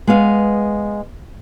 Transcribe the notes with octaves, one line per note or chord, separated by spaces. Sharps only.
G#3 B3 F5